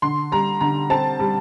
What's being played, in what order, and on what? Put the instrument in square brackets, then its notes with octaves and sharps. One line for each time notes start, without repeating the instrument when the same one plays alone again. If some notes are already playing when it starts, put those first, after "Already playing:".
[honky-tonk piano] D3 C6
G3 A#5
D3 A#5
C4 A5
G3